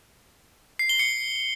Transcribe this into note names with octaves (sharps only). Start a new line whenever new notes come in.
C7
G7
C#7